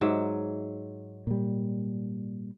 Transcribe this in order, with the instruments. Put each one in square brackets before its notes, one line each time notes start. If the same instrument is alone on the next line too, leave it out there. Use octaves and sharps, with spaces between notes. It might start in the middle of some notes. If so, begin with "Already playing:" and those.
[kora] G#2 F#3 E5
[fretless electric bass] A#2 G3